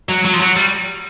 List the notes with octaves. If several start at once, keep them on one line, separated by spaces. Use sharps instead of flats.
F#3
F#3
F3
F#3
G3